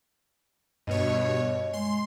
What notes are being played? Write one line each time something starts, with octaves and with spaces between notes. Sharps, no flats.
G2 B2 C#5 D#5
G#3 C6